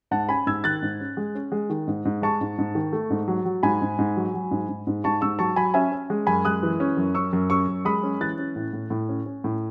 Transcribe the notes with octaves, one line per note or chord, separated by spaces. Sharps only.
G#2 F#5 A5
C#4 G#5 B5
G#2 E6 G#6
D#3 F#6 A6
G#2
C#4
G#3
C#4
G#3
D#3
G#2
G#2
G#3 A5 C#6
G#2
G#2
D#3
A3
G#2
F#3
F#3
G#2 G#5 B5
G#2
G#2
F#3
F#3
G#2
G#2
G#2
G#2 A5 C#6
G#2 C#6 E6
F#3 A5 C#6
F#3 G#5 B5
C#4 E5 G#5
C#4
G#3
F#2 G#5 B5
G#3 D#6 F#6
E3
C#4
F#2
C#4 C#6 E6
F#2
C#4 C#6 E6
F#2
G#3 B5 D#6
C#4
E3 F#6 A6
C#4
A2
A2
A2
C#4
C#4
A2